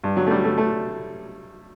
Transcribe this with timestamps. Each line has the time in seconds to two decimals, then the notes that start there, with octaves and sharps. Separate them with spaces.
0.04 G2
0.17 F#3
0.26 A3
0.31 G3
0.44 A3
0.58 A3